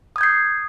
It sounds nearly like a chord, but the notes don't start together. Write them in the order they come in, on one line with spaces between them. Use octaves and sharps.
D#6 G#6 G6 C7